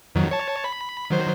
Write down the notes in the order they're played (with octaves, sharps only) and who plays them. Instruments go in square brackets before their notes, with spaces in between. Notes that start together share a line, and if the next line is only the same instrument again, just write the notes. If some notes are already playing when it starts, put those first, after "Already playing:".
[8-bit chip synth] F2 D#3 F#3
C#5 A5
B5
D#3 F#3 C5